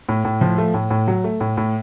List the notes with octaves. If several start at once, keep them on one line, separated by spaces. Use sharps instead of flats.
A2
A2
F3
A3
A2
A2
F#3
A3
A2
A2